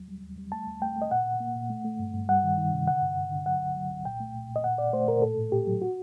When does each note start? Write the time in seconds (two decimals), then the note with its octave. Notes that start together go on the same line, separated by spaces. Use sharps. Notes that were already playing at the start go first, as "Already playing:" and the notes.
Already playing: D#2 F#3
0.08 G3
0.23 D#2
0.38 G3
0.52 A3 A5
0.67 D#2
0.82 A3 G5
0.96 A3
1.02 D#5
1.11 A#2 F#5
1.25 A#2
1.40 A#3
1.56 A#2
1.70 A3
1.85 A3
1.99 G2
2.14 G2
2.29 G3 F#5
2.44 D#3
2.58 D#3
2.73 C3
2.87 D3 F#5
3.02 G2
3.17 G2
3.32 D3
3.46 F#3 F#5
3.61 C2
3.76 F#3
3.91 C2
4.05 A#2 G5
4.20 A3
4.35 A#2
4.49 A#2
4.56 D#5
4.64 A#2 F#5
4.78 A#2 D5
4.93 A3 C5
5.08 A#2 A#4
5.22 A2 A4
5.38 A2
5.52 A2 G4
5.67 F#3
5.82 F#4